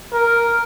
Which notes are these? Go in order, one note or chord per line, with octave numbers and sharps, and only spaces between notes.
A#4